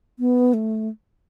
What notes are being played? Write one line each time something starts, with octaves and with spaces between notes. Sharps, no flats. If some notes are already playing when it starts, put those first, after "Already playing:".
B3
A3